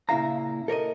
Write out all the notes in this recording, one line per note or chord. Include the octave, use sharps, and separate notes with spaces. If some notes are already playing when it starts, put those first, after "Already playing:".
A#2 C#3 E4 F5 A#5
A4 A#4 C#5 D#5